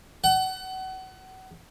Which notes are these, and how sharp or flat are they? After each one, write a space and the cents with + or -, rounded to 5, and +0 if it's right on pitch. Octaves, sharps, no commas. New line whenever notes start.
F#5 +30